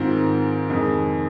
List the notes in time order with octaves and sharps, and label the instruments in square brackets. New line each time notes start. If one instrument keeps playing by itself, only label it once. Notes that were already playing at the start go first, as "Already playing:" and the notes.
Already playing: [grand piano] G#2 D#3 C4 F4 A#4
F2 C3 D#3 G#3